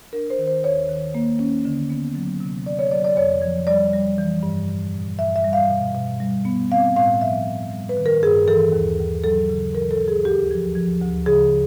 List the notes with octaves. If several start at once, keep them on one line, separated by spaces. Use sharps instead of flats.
D4 A#4
C5
D#3
C5
D#2 C#5
D#3
A#3
C#4
D3
B3
F#3
C3
F#3 D5
C#5
F#3 D5
D5
F2 C#5
F3
G3 D5
G3
E3
G2
A#2
A#2
G2 E5
E5
G3
F5
B2
B2
G3
B3
C4 F5
A2 F5
F3 E5
G2
G3
B4
D#3
A#4
G2 G#4
E3 A4
D#2
D#2
F#3 A4
C#3
E3 A#4
A4
E3
G#4
D2 G4
F3
F3
D2
C#3 G#4